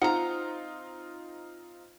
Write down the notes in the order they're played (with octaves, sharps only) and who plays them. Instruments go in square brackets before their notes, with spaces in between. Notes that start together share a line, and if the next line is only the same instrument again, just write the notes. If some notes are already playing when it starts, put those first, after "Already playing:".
[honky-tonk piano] C4 D#4 F4 [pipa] F#5 A#5